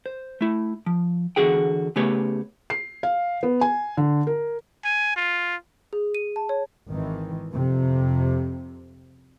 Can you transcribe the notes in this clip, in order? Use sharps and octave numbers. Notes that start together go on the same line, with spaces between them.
C5
A3 E4
F3
E2 D3 F#4 G#4 G5
C#3 A3 B3 G4 C#5
C7
F5
B3
G#5
D3
A#4
G#5
F4
G#4
D#7
A5
C#5
G#1 D#3 E3
F2 C3